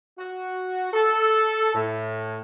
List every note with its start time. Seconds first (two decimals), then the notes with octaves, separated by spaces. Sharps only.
0.18 F#4
0.94 A4
1.74 A2